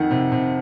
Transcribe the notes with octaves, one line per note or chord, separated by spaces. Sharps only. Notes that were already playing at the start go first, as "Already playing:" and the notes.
Already playing: F2 D#3 F#5
C3
C3